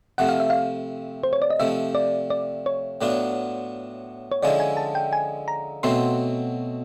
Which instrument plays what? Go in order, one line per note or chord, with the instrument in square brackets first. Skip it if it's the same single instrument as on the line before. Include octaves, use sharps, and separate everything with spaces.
[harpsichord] C3 F3 A3 [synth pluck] F#5
[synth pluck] F5
E5
F5
C5
C#5
D5
D#5
[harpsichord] C3 F3 A3 [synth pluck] E5
[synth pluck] D5
D5
C#5
[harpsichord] A2 F#3 B3 D4 F4
[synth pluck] C#5
[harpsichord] D3 F3 G#3 C#4 E4 [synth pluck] D5
[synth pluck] G#5
A5
G5
G#5
A#5
[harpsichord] B2 F#3 A3 C4 [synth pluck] C6